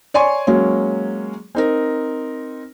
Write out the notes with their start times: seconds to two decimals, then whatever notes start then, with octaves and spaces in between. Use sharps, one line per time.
0.14 C#5 D5 G#5 C6 C#6
0.47 F#3 G#3 A#3 C#4
1.55 C4 D#4 A#4